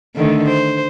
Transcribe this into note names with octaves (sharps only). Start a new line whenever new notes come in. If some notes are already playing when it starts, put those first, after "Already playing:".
D3 D#3 A3
C5